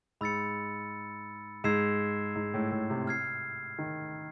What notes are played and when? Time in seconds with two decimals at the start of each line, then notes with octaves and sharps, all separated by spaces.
0.21 G#2 B5 E6 A6 C#7
1.64 G#2 E6 G#6 C7 E7
2.36 G#2
2.54 A2
2.71 A2
2.90 C3
3.07 F6 G#6 C7
3.79 D#3